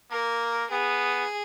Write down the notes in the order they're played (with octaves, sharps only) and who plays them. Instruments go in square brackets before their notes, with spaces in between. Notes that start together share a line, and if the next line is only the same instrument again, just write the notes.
[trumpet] A#3 [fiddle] A#4
[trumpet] B3 [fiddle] G#4